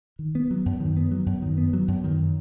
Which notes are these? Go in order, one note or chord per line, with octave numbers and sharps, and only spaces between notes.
D#3
B3
F#3
F#2
D#3
B3
F#3
F#2
D#3
B3
F#3
F#2
D#3